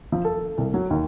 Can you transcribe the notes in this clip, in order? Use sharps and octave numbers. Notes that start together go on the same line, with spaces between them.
F3
A4
C2
F#3
D#2